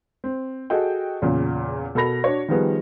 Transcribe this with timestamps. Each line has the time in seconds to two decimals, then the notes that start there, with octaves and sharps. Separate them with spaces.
0.24 C4
0.70 F#4 G#4 A4 D#5 G5
1.22 E2 A#2 C#3
1.95 B2 A4 A#4 B5 A#6 F7
2.24 D4 F#4 C#5
2.48 D#3 F3 G3 B3 G#4